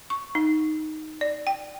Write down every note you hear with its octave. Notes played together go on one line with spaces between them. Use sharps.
C#6
D#4
D5
G5